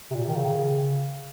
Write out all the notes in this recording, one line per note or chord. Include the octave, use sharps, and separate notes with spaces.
C3
A#2
D#3
C#3